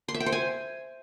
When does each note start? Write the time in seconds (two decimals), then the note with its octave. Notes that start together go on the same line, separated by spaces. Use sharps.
0.08 C6
0.14 E5
0.20 G5
0.26 C5
0.32 G#5